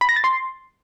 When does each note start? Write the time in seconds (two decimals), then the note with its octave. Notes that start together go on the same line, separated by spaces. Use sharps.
0.01 B5
0.09 A#6
0.16 A6
0.24 C6